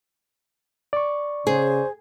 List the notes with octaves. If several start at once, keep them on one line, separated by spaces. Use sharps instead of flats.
D5 C#6
C#3 G#4 C5